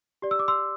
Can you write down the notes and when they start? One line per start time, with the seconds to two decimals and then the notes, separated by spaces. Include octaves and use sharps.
0.22 G4 D5
0.31 E6
0.39 D6
0.48 C6 E6